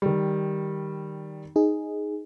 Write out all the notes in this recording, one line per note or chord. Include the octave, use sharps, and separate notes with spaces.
D#3 G3
D#4 G#4